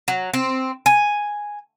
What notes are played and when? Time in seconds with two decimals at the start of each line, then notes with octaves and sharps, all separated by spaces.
0.08 F#3
0.34 C4
0.86 G#5